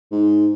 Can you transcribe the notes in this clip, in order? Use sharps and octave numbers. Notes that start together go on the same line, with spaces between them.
G#2